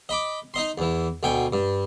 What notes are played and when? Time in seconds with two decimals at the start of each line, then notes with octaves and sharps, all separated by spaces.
0.09 D#5 B5 D6
0.54 D#4 D#5 C6
0.78 E2 E3
1.23 D2 B2 G5 G#5
1.53 G2